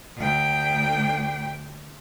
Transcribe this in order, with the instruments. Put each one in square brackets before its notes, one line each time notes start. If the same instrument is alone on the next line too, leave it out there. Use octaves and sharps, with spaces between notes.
[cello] D2 G5